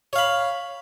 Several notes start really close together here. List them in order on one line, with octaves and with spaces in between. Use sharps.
C#5 F5 B5